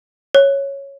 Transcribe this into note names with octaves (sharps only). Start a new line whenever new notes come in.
C#5